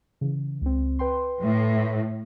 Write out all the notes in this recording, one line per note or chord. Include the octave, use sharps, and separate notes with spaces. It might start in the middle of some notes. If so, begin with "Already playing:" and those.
C#3 E3
C#2 C4
B4 G5 C6
A2